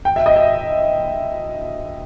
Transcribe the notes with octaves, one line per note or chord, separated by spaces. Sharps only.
G5
E5
D#5
E5